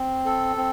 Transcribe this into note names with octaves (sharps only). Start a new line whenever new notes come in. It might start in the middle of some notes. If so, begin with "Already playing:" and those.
Already playing: C4
A4
C4